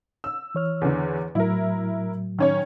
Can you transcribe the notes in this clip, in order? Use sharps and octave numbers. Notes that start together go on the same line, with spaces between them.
E6
E3 C#5 F6
E2 D3
A2 F#3 E4 A#4
D#3 C#4 C#5